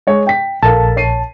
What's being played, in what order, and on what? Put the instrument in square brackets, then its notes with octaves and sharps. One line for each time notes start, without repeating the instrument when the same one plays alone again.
[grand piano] G#3 C#5
G5 B6
[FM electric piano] A#1 A5 [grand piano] A4 A#4 F5
[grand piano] C#5 C7 D#7